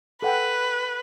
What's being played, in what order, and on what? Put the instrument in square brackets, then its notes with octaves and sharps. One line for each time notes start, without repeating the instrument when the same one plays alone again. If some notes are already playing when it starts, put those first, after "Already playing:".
[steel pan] A4 F#5 G5 [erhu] B4